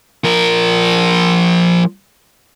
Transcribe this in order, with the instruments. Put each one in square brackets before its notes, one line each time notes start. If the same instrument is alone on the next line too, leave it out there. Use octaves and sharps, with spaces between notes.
[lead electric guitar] F3 A#4